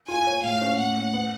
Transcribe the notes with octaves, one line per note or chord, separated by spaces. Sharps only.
F4 G#5
C#5
A2 F5
C#4
A2 F#5
A2
B3